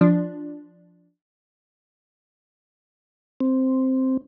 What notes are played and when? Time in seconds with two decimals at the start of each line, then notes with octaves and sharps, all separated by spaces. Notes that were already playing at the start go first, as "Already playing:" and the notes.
0.01 F3 D4
3.40 C4